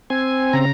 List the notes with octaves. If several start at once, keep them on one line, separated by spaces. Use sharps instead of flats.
C4 G#5
C#3 A#5